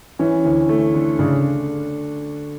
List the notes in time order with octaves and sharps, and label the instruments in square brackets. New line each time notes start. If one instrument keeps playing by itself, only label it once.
[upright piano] E3 [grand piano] C#4
[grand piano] D2
A3
D3
[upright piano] C#3 [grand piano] D4